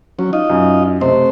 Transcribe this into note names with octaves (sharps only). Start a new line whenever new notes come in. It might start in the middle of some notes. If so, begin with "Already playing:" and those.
F#3 C#4
D#4 F4 D#5
F#2
C3 A3 C5 D#5